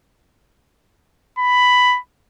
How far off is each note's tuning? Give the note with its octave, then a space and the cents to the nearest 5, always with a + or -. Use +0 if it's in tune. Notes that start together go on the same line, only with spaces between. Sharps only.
B5 +5